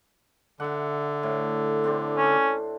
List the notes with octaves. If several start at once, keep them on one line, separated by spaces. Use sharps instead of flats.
D3 E5 F#5
A2
C4 D4 A4
C#4